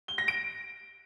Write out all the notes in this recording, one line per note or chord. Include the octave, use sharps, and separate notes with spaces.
G7
A#6
D7